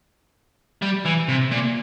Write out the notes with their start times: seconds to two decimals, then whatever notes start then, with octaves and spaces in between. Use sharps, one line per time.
0.82 G3
1.06 E3
1.29 C3
1.52 A#2